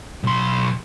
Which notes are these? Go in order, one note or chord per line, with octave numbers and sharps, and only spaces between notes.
B1 C6